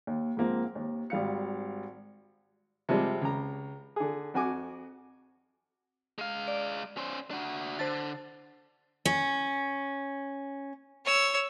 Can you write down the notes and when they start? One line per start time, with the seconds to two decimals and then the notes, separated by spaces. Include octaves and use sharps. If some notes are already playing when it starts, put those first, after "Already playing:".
0.07 D#2
0.37 G#2 F3 A#3 C4
0.75 D#2
1.10 G#1 G3 F5 C#7
2.89 C3 F3 G3 G#3
3.22 C#2 A#5
3.96 D3 G#4
4.34 F2 F#4 G#5 D6
6.18 G#3 F5
6.48 D5
6.97 C#4 C5
7.31 D4 F#4
7.79 D3 C5 A5 A6
9.05 C#4
11.05 C#5 E6